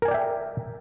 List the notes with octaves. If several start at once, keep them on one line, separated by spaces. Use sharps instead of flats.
A#4 D5 E5 G5 G#5